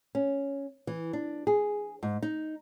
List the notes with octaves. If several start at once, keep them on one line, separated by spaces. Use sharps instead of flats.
C#4
E3
D4
G#4
G#2
D#4